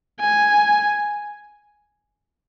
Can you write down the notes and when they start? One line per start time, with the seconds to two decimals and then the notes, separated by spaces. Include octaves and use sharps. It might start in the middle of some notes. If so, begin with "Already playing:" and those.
0.20 G#5